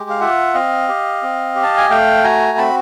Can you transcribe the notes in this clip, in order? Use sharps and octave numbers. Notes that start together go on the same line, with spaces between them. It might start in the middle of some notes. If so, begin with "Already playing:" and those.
Already playing: G#3 G4
F5
F4 E5 F#5
C4 D#5 F5
G4
C4
G4
A5
G#5
A3 F5 G5
F#4 G#5 A#5
C4 A5 B5